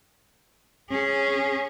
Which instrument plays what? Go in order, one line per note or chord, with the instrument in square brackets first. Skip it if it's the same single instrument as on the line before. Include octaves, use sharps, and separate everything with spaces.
[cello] C#4 G#4